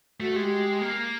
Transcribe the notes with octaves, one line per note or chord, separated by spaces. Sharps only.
A3 F#4
G#3 G4
A#3